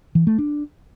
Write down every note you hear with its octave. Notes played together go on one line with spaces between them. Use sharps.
E3
A3
D4